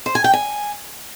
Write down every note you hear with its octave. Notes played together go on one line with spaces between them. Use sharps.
C5
G#5
G5
G#5